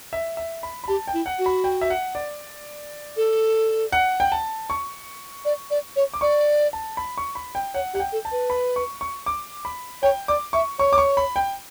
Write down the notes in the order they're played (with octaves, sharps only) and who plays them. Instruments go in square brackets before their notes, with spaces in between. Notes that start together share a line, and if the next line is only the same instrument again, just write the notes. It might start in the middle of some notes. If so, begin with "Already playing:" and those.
[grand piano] E5
E5
B5
B5
[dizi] G4 [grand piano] A5
[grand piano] G5
[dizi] E4
[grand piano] F#5
[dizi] F#4
[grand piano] B5
G5
E5
F#5
D5
[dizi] A4
[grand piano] F#5
G5
A5
C#6
[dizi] D5
D5
C#5
[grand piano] D6
[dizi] D5 [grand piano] C#6
[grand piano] A5
B5
C#6
B5
G5
[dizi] C#5 [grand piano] F#5
[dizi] G4 [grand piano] F#5
[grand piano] G5
[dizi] A4
[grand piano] A5
[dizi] B4
[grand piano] B5
C#6
C#6
D6
B5
[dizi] C#5 [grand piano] G5
[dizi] D5 [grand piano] D6
[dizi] E5 [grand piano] C#6
[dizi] C#5 [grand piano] C#6
[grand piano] D6
C#6
B5
G5